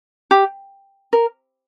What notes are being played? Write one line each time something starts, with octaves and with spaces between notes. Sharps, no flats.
G4
A#4